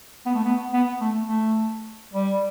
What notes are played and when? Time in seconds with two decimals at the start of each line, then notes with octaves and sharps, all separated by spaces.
0.26 B3
0.35 A3
0.44 B3
0.73 B3
1.01 A3
1.29 A3
2.13 G3